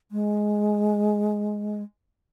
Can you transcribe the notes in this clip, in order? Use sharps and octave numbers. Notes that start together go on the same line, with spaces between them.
G#3